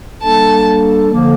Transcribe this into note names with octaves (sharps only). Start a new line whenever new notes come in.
G3 A#3 D4 A4 A5
D3 F3 A#3